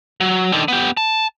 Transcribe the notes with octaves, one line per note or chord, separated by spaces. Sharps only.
F#3
D3 D#3
B3 G4
A5